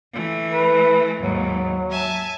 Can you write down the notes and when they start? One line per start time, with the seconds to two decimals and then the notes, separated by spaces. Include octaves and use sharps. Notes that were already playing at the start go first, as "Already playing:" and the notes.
0.12 E3 A3
0.51 B4
1.20 D#2 G#2 F#3
1.90 E5 G#5 A5